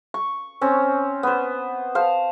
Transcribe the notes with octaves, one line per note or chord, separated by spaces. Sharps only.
C#6
C4 C#4
B3 C5
C5 F5 A5